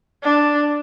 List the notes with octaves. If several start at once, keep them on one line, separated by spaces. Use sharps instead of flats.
D4